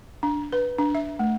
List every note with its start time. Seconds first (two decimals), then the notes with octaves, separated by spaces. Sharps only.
0.23 D4
0.53 B4
0.78 D4
0.95 E5
1.19 A3